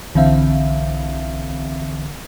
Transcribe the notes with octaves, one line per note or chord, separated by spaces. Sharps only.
B1 D3 E3 C4 E5 F5